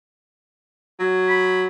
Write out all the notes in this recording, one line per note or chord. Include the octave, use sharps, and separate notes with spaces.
F#3
B5